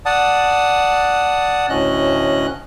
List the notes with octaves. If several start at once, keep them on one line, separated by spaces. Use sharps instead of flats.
D5 F#5 A5 D#6
D2 A2 C#4 D#5 F#6